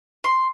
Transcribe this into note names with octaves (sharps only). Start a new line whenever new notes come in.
C6